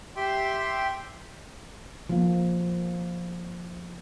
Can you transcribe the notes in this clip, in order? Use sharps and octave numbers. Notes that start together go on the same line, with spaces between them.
G4 E5 G5 C6
F3 A#3